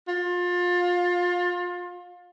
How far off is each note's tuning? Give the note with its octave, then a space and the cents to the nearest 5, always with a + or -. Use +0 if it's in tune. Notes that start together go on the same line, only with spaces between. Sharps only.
F4 +25